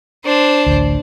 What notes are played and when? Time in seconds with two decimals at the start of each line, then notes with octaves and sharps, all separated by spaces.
0.25 D4 C5
0.66 A1 D2